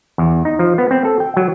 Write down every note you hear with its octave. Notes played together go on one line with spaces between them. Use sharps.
E2
D#4
F3
B3
C4
A4
G5
F#3